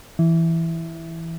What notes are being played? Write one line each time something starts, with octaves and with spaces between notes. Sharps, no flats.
E3